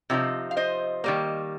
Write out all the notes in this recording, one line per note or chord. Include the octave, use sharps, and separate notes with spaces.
C3 F3 D#4
F5
C5 D#5
D#3 G3 A#3